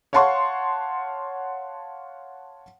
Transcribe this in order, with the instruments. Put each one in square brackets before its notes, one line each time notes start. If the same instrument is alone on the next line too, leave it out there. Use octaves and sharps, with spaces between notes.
[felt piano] C#5 F5 F#5 A5 C6 C#6